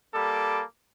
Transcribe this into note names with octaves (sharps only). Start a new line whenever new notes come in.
G3 A#3 A4 B5 D6